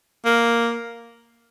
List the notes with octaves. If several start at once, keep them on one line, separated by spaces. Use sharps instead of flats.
A#3